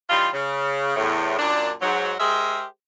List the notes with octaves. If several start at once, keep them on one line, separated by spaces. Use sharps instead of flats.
E3 G3 D#4 F4
C#3
E2 A2
F#2 A#2 A#3 D4
G#2 F#3
G#3 G4 G#4 A#4 C5 E5